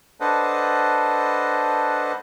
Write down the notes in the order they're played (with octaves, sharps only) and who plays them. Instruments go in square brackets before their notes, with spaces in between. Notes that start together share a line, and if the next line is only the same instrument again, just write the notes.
[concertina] D4 A4 B4 C5 D#5 F#5